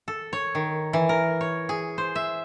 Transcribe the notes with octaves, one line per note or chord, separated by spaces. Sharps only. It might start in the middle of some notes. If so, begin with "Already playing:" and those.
A4
C#5
D#3
E3
A#4
C#5
G#4
C5
E5